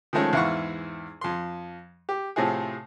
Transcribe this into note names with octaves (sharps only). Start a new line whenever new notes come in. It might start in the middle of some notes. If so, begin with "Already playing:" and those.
D#3 F3 G#3 A3 C#4
E2 G#2 E4 F5 F#5 C#6
F2 C6
G4
A2 C3 F3 A3 G#4